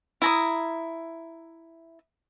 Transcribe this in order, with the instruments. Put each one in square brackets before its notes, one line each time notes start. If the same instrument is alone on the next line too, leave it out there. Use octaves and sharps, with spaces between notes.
[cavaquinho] E4 A#5 D#6